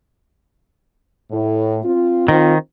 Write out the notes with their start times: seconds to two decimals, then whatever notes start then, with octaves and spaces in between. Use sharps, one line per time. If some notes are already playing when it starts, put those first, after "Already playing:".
1.31 A2
1.85 C4 F4
2.28 D#3 C4 D#4 F4